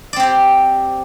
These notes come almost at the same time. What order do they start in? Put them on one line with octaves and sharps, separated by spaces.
D5 C4 G4 C5